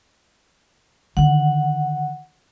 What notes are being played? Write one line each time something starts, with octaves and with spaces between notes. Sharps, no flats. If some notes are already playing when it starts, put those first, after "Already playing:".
D3 D#3 F#5